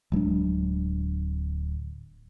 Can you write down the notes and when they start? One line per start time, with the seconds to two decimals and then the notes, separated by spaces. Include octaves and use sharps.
0.12 D1 F#3 G#3 D4